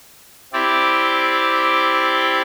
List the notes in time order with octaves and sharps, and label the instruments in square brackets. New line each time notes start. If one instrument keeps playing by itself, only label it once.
[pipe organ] C4 E4 G4 D5